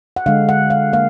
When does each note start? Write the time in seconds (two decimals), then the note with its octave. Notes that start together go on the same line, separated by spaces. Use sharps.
0.16 F#5
0.26 D3 G#3 F5
0.49 F#5
0.70 F5
0.93 A#3 F5